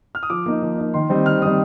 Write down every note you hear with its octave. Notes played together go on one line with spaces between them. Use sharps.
F6
D#6
F3 D6
A#3 D#4
F3
A#3 D#4
D#3 C6
G3 C4 D#4
D#3 F6
G3 C4 D#4 D#6